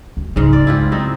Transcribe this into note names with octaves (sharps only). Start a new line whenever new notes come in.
D2
C#2 G#2 G#3
C#3 D5
E4 F4 G4
C4 D#4